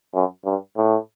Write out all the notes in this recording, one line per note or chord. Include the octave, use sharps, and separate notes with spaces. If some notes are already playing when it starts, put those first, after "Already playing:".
F#2
G2
A2